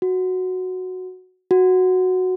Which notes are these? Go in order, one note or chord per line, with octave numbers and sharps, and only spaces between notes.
F#4
F#4